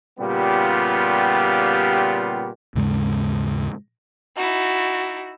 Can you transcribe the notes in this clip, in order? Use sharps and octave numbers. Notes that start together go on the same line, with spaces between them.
A#2 C#3 G3 B3 F4 G4
D#2 G#2 C#3 G#3
D#4 E4 F#4